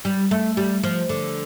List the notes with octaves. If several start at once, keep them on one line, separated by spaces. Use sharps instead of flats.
G3
A3
G3
F3
D3